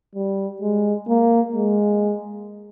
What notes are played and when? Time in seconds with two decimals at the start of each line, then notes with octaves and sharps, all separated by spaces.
0.15 G3
0.62 G#3
1.08 A#3
1.55 G#3